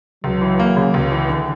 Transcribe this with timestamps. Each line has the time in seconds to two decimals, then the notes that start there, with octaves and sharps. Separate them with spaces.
0.24 C#2 F#3
0.41 E3
0.59 A#3
0.77 C#3
0.94 C#2
1.12 E3
1.29 D3